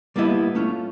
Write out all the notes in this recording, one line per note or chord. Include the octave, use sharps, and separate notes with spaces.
G3 A#3 B3 E4 D#5
A3 C#4 F4